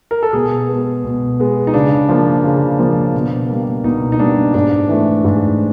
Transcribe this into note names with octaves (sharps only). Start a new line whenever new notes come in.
A#4
A4
B2 G#4
G#3 B3
B2
G#3 B3
D#4
C#3 D4
F3 A#3
C#3
F3 A#3
B2
G3 A#3
B2 D#4
D#4
G3 A#3 D4
G#2 D4
E3 A3
G#2